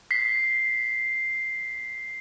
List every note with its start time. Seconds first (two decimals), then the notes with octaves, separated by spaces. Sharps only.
0.11 B6 C7